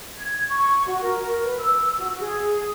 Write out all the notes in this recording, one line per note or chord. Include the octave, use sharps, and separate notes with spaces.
G#6
C#6
F#4
A#4
B4
E6
F#4
G#4